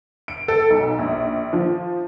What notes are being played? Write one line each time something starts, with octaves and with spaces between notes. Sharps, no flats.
D7
A4
B1
A#1
F3